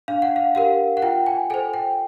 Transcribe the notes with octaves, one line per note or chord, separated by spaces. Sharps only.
D4 F5
F#5
F5
G4 A#4 F5
F#5
F4 G5
G#5
A4 C5 G#5
G5